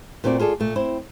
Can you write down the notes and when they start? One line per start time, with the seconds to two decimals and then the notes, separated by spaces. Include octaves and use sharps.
0.24 A#2 A3 C4 F#4 B4 D5
0.39 F4 G#4 A4 D5
0.60 A#2 A3
0.76 C4 E4 C5